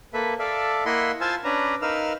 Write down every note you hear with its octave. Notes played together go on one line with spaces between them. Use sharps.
A#3 A4 B4 E5
A4 D5 E5 F5
A#3 E4 D#5 F#5 B5 C6
F4 C5 F5 G#5 A5 E6
C#4 D4 B4 A#5
D#4 A#4 B4 F5 E6 F6